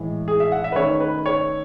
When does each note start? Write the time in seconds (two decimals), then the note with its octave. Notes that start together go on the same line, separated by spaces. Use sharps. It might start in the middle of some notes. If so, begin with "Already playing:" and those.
Already playing: A2 E3 G#3
0.28 G#4
0.40 E5
0.52 F#5
0.64 E5
0.72 B4
0.76 D#3 A3 C#4 C#5
1.00 B4
1.26 C#5